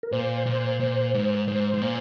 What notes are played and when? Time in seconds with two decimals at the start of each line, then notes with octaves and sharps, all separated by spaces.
0.03 A#4
0.12 A#2 C5
0.46 A#2
0.80 A#2
1.14 G#2
1.48 G#2 C5
1.74 G#2
1.82 A#2